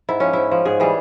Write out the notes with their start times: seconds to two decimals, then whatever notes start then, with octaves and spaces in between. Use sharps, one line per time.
0.09 G#2 E4
0.20 F3 C#4
0.33 G#2 E4
0.51 F3
0.65 G#2 G#4
0.80 E3 G3 G#4